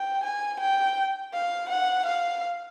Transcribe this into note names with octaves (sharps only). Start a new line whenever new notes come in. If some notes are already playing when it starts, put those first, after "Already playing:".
Already playing: G5
G#5
G5
F5
F#5
F5